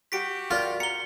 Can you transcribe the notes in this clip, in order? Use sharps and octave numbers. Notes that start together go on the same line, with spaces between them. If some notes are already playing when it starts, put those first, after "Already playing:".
F#4 G4 B6 D7
F4 A#4 D5
A#5 C#7 G7